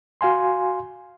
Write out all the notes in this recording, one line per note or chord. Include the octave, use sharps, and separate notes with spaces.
F#4 F5 G#5 C6